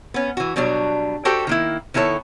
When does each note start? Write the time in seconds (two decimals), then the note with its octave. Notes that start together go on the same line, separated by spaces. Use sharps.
0.14 B3 C#4
0.37 E3 F#4
0.56 B2 F#3 G3 D4
1.25 F#4 G4 A4 C5 G5
1.47 D#3 A#3 E4
1.94 D#3 B3 E4 A4 C#5